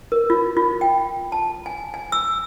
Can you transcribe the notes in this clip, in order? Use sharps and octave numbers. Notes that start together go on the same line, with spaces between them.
A#4
F4
F4
G5
A5
G#5
G#5
E6